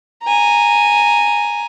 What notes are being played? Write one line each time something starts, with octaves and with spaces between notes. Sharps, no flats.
G#5 A#5